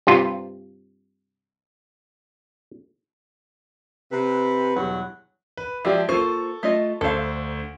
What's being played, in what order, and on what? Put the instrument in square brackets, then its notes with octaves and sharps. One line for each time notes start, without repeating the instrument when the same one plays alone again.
[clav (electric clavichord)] G2 C3 F4
[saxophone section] C3 B4
E2 G2 B2 F#3 F#5
[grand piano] B4
[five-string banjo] F3 G#3 [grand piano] G4 D5 E5
[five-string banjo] A#3 F4 C5 [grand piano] A4 C#6
[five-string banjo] A3 F4 D#5
[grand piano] D2 C5 [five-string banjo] A4 F5